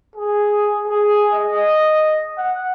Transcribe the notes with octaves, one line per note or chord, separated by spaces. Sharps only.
G#4
G#4
D#5
F#5